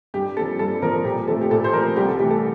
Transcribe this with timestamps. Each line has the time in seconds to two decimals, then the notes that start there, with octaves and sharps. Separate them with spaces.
0.14 G2 G4
0.36 A#3 A4
0.40 F3
0.59 G2 A4
0.82 F3 A#3 A#4
1.05 A#2 G4
1.28 F3 A3 A4
1.41 G4
1.51 A#2 A4
1.64 C5
1.73 F3 A3 A#4
1.96 C2 G4
2.08 A4
2.19 C3 E3 A3 G4
2.31 A4